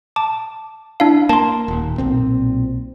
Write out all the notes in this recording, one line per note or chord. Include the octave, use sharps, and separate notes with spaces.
A5 D6
D4 E4 F5
A#3 A5 C6
D#1
B1 A#2 C4